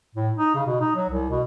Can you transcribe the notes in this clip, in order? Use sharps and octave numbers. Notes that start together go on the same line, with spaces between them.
A2
D#4
C#3
B2
D#4
F#3
C2
B2